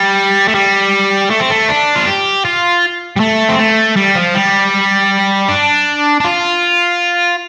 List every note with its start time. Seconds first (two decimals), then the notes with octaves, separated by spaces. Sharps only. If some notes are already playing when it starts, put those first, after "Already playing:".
Already playing: G3
0.48 A3
0.55 G3
1.30 A3
1.40 C4
1.50 A3
1.69 D4
1.95 F4
2.07 G4
2.45 F4
3.16 G3
3.20 A3
3.49 C4
3.59 A3
3.96 G3
4.15 F3
4.35 G3
5.49 D4
6.20 D4
6.24 F4